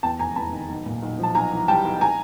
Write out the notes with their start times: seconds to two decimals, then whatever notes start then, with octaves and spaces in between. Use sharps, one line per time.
0.03 E2 G5 A5
0.19 F1 G#5 A#5
0.36 E2 A5 B5
0.53 D#3
0.69 B1
0.86 A#2
1.03 B1
1.19 F3 A5
1.35 B1 G#5 A#5
1.52 E3
1.68 G3 G5 A5
1.85 B1
2.01 G#5 A#5